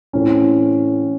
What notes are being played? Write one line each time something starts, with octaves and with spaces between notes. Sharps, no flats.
A2 E3 A3 C4 C#4